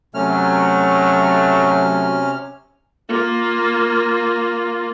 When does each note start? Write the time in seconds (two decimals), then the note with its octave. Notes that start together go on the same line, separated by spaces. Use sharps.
0.15 C3 F#3 A3 C#4 F6
3.09 A#3 F4